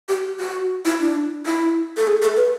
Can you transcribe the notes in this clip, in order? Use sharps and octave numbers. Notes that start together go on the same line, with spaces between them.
G4
F#4
E4
D4
E4
A4
G#4
A4
B4